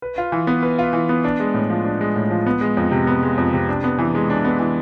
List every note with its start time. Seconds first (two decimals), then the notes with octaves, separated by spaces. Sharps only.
0.02 B4
0.18 F4
0.32 E3
0.47 B3
0.63 B4
0.79 F4
0.93 E3
1.09 B3
1.24 D4
1.40 G#3
1.54 A2
1.69 F3
1.85 D4
2.01 G#3
2.16 A2
2.31 F3
2.46 B3
2.61 G#3
2.77 F2
2.91 C3
3.07 B3
3.23 G#3
3.38 F2
3.53 C3
3.69 D4
3.84 B3
3.99 E3
4.15 G#3
4.30 D4
4.44 B3
4.59 E3